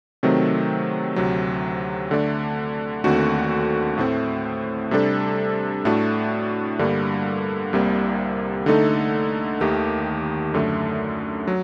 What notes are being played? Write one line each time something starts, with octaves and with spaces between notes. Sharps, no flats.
C3 D#3 F#3 A3 C4
D2 C3 F#3
D3 A3 D4
D#2 D3 A3 C4 F#4
A2 A3 C4
C3 G3 D4 A4
A2 A3 D4 F#4
G2 D3 G3 A#3
C2 C3 G3 A#3
D3 A3 D#4 A4
D#2 D#3 A3 D#4 G4
F#2 D3 A3
F#3